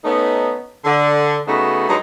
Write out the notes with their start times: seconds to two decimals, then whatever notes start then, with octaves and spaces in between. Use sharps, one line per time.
0.05 A3 B3 C#4 D#4
0.85 D3
1.47 C#3 A3 B3 D#4 F#4
1.88 G2 F#3 G#3 D#4